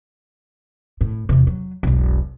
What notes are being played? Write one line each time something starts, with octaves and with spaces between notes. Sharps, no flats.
A2
E2 C3
F#3
E1 B1